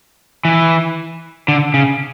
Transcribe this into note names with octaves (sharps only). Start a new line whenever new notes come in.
E3
D3
C#3